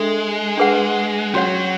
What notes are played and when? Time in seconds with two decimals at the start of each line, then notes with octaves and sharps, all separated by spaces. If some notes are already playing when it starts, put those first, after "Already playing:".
Already playing: G#3 D4 A4 E5
0.57 D4 G#4 B4 F#5
1.34 F#3 C#4 F#4 C#5 F#5